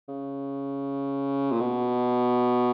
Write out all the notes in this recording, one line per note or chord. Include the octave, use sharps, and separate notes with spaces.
C#3
A#2
B2